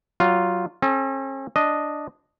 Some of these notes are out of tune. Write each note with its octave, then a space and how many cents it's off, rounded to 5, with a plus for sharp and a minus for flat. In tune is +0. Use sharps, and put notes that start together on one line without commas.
F#3 +20 F4 +0
C#4 -45 A4 -35
D4 +0 D#5 +0